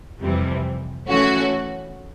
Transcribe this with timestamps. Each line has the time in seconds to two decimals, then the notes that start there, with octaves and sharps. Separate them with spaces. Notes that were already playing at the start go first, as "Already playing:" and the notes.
0.19 F2 C3 E3 G3 C4
1.08 E3 A3 C#4 F#4